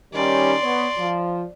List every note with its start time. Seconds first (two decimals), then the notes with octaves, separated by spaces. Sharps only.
0.13 D#3 G3 C#4 D5 C6
0.63 B3 C#5
0.98 F3